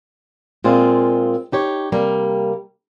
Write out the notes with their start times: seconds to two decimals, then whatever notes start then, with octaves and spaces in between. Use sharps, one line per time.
0.64 A#2 G#3 C4 F4
1.52 D#4 G4 C#5
1.92 C3 G3 A#3